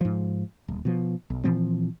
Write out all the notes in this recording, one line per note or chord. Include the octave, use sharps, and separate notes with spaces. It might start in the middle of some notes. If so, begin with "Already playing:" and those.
G#2 F3
D#1
B2 F3
B1
A#2 E3 F3 C4